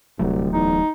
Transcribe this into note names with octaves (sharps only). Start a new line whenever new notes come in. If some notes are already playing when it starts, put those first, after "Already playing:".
D1 C2 F#3 A3
E2 D#4